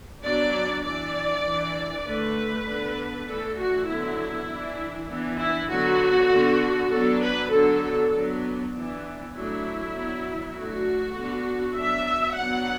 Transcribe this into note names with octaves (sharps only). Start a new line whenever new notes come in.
F#3 B3 D4 D5
E3 D4 D5
E3 D4
D3 A3 D4 B4
D3 B3 D4
E3 A3 D4 A4
F#4
D3 F#3 B3 E4
E3 D4
E3 B3 D4
E4
D3 F#3 B3 F#4
D3 B3 D4
F#3 B3 D4 A4
B4
D3 F#3 B3 D4 A4
F#3 B3 D4
E3 B3 D4
F#3 A3 D4 E4
F#3 B3 D4
F#3 A3 D4 F#4
D3 B3 D4
F#3 B3 D4 E5
F#3 B3 D4 F#5